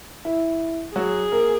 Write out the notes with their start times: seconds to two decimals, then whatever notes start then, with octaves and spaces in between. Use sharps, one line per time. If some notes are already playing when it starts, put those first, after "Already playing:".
0.25 E4
0.96 F#3 F#4 G#4
1.32 A#3 A#4